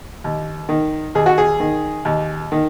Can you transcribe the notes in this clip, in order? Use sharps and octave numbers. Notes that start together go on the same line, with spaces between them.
D#2
D#3
D#2 G#4
F#4
G#4
D#3
D#2
D#3